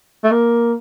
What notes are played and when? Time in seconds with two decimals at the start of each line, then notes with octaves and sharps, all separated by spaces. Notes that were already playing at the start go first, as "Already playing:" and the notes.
0.24 A3
0.31 A#3